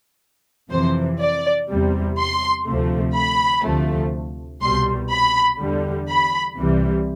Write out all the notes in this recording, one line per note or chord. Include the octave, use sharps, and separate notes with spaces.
F2 C3 E3 C5
D5
E2 C3 G3
C6
D2 C3 F3 A3
B5
D2 C3 F3 A3
C2 B2 G3 C6
B5
E2 D3 G3
B5
C2 C3 E3 G3